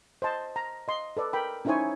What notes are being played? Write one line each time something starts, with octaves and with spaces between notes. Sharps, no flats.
C5 D#5 A5
A#5
D#5 C6
A4 B4 D5
A#4 G5 B5
C#4 D#4 E4 C5 C#5 G#5